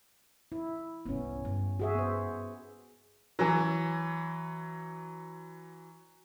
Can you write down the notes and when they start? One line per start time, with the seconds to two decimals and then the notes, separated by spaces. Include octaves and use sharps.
0.52 E4
1.06 C2 G#2 B3 C#4
1.45 G2 C#3
1.80 F#4 G#4 E5
1.95 B3 C5
3.39 E3 F#3